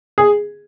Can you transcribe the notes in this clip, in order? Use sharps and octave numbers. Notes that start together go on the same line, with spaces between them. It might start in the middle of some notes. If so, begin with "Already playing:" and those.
G#4